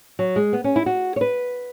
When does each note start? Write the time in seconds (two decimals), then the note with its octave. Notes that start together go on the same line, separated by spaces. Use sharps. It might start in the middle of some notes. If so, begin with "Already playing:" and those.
0.19 F#3
0.36 G#3
0.53 B3
0.64 C#4
0.76 E4
0.86 F#4
1.16 C#5
1.21 B4